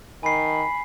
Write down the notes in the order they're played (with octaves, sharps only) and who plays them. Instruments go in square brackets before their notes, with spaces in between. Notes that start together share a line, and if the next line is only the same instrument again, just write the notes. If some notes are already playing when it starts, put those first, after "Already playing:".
[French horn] D#3 [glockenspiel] G#5 C7 [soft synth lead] B5